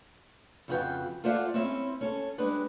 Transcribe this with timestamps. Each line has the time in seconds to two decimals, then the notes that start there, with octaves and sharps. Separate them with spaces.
0.68 F2 C#3 F4 F#4 B4 G5
1.24 F4 A4 C5 D5 E5 F#5
1.54 C4 C#4 E4 E5
2.01 C#4 A4
2.38 G3 G#3 D4 B4